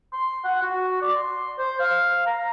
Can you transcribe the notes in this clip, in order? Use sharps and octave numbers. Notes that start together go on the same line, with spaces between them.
C6
F#5
F#4
D5
C6
C5
F5
A#5